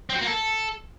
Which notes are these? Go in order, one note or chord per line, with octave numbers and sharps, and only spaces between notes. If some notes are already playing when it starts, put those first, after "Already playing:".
C4
F#4
A#3
A4